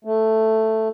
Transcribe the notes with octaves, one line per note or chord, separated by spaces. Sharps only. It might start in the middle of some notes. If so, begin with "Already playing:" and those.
A3